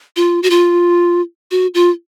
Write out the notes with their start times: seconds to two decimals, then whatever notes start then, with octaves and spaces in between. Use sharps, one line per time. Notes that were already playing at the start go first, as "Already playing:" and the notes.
0.16 F4
0.43 F#4
0.50 F4
1.51 F#4
1.74 F4